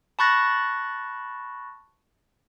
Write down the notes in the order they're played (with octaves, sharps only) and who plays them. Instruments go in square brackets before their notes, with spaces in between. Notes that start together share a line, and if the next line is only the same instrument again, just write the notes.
[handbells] A5 B5 C#6 F#6 A6 A#6